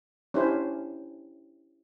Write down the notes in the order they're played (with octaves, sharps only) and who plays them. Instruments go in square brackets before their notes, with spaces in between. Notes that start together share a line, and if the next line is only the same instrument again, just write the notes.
[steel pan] C#4 D4 E4 G4 C5